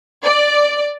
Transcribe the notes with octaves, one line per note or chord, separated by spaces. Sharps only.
D5